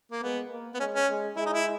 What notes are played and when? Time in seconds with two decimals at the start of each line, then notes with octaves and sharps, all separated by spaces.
0.12 A#3
0.23 G#3 B3
0.51 A#3
0.74 B3
0.80 G#3 C#4
0.94 C#4
1.09 G#3
1.36 G#3 E4
1.46 D#4
1.54 E4